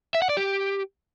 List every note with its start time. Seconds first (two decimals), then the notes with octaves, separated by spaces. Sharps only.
0.15 E5
0.22 F#5
0.29 D5
0.37 G4